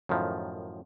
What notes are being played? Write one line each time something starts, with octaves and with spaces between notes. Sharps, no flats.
F#2 A2 D#3 F3